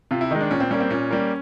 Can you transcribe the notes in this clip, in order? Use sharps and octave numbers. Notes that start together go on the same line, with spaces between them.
C3 F4
E4
D#3 G#3 D#4
D4
A#2 C#4
C4
G3 A#3 C#4
C4
A#2 C#4
G3 A#3